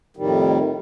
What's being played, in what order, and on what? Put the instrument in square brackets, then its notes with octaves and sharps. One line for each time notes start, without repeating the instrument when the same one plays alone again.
[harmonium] F2 A2 D#3 G3